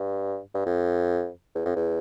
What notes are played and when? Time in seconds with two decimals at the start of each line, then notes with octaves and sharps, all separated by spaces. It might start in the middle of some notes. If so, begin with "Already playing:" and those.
Already playing: G2
0.54 G2
0.65 F2
1.55 E2
1.65 F2
1.76 E2